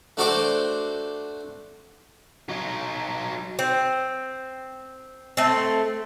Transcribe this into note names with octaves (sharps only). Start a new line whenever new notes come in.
A3 D4 F#4 A4 C5 D6
F#3 D#4
C4
A3 C4